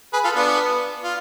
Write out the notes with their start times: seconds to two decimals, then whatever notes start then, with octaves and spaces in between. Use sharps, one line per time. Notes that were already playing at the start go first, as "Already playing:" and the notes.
0.13 G#4 B4
0.24 F4 A4
0.36 B3 D4
1.04 F4